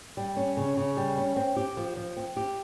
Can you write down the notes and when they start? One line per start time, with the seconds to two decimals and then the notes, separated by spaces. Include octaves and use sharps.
0.17 G3
0.37 C#4
0.57 C#3
0.77 C#3
0.97 G3
1.18 C#4
1.36 C4
1.56 G4
1.77 F3
1.97 F3
2.17 C4
2.37 G4